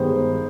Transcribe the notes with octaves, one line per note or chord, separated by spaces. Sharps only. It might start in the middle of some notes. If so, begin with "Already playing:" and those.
Already playing: G2 D#3 G#3 B3 C5